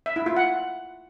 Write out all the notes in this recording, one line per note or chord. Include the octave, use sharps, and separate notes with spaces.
E5
E4
F4
F#5